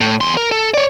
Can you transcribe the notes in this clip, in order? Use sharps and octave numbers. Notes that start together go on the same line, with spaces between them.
A2
E2 C6
A#4
A4
C#5 D5